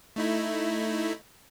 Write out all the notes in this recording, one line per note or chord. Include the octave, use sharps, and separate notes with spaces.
A3 D#4 E4